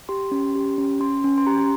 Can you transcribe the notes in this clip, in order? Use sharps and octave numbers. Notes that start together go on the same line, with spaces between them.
G4 C6
C#4
G4
C#4
C#4 C6
C#4
C6
G4 A#5